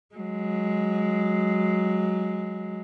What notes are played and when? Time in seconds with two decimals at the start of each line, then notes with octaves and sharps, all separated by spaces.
0.15 F#3 G#3